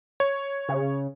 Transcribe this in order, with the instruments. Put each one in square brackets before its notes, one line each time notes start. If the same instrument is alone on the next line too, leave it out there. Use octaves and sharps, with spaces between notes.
[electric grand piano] C#5
[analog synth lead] C#3